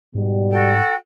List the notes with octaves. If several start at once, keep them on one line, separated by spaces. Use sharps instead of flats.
G#2 B2 G3
F#4 A4 G5